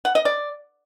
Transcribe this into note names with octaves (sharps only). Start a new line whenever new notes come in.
F#5
D#5
D5